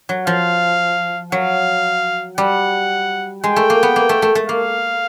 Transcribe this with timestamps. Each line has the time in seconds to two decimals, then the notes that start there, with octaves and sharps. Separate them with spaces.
0.09 F#3
0.27 F3 F5
1.32 F#3 F5
2.37 G3 F#5
3.43 G#3 G5
3.56 A3
3.70 A#3
3.83 B3
3.96 A#3
4.09 A3
4.22 A3
4.35 A3
4.48 A#3 F5